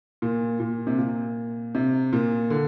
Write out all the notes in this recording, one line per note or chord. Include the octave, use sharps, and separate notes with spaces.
A#2
A#2
C3
A#2
C3
A#2
D3